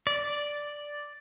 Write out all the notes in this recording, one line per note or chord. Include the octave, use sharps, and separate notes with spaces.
D5